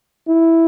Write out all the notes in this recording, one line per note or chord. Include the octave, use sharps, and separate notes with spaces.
E4